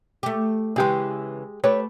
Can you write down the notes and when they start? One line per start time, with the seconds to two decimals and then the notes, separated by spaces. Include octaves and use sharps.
0.23 A3 G4
0.76 C#3 E3 G#3 G4 G#4
1.64 A3 G4 B4 C#5